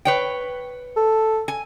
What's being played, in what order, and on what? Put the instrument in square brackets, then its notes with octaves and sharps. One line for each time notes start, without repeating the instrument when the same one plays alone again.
[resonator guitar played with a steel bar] B4 C#5 G5
[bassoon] A4
[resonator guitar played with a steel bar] G#5